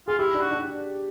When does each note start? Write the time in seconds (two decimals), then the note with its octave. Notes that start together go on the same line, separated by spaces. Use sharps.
0.08 F4 G#4
0.19 E4 G4
0.34 D4
0.40 F#4
0.51 D4